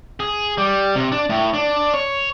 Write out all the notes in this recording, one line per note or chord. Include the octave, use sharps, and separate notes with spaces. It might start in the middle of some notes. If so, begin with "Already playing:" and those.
G#4
G3
C3
D4
A2
D4
C#5